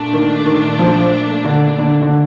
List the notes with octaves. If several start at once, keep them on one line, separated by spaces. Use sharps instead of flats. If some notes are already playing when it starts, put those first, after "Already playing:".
Already playing: A#2 A3 D4
D#3
D#3
F3
D3
D3
D3